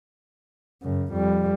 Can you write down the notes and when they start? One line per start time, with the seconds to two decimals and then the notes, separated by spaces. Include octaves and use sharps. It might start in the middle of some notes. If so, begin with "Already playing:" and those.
0.82 F#2 C#3
1.13 F2 G3